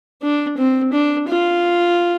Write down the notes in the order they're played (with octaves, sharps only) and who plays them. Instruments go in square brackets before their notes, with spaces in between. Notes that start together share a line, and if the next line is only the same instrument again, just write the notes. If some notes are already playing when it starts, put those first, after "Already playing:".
[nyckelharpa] D4
C4
D4
F4